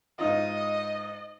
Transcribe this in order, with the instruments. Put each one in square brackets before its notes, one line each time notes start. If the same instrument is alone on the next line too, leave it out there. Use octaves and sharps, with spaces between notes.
[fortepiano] G#2 D#4 F4 [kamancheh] D#5